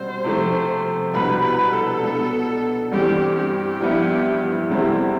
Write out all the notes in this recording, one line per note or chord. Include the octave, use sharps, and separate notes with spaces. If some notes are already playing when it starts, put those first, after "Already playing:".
Already playing: B2 G3 C4 C5
C3 F3 A3
C2 B2 B3 D4 B4
B4
A4
B2 B3 D4
G2 E3 G3 C4 G4
G4
G2 F3 B3 E4
E2 C3 G3 C4 E4 A4